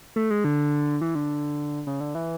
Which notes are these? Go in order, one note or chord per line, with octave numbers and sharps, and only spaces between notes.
A3
G#3
D3
E3
D3
C#3
D3
E3